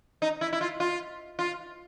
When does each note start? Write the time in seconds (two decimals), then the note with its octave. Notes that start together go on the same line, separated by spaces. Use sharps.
0.22 D#4
0.41 E4
0.53 E4
0.61 F4
0.80 F4
1.39 F4